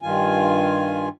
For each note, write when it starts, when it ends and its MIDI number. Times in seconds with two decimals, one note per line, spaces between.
0.02 1.09 43
0.02 1.09 51
0.02 1.09 65
0.02 1.09 80